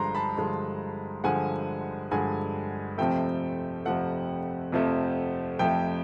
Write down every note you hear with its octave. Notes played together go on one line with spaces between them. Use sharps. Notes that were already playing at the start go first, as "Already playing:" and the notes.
Already playing: G2 D3 F3 G#3 A#5 C6
A5 B5
G2 D3 F3 G#3
G2 D3 F3 G#3 F#5 G#5
G2 D3 F3 G#3 F#5 G#5
F2 C3 F3 A3 G5
F2 C3 F3 A3 F#5
F2 C3 F3 A3
F2 C3 F3 A3 G5